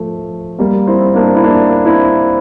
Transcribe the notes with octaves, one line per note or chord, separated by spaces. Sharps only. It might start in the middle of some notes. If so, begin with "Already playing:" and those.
Already playing: F3 A3
G3 A#3
C4 E4
A#3 D4
E4
A#3 D4
C4 E4